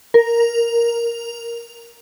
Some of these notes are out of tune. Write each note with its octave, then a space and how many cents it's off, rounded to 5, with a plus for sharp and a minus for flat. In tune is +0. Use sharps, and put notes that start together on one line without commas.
A#4 +5